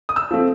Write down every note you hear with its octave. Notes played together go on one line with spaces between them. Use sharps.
D#6
E6
F3 A3 C4